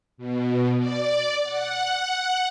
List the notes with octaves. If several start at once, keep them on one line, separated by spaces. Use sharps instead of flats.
B2
D5
F#5